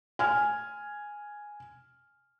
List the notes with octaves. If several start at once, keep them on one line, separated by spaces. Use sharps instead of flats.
G#5 F6